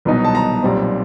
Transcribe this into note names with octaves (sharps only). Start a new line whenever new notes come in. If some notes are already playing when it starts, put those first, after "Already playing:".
C2 B2 F#3 B3 D#4
A5
A#5
B1 A#2 G3 C4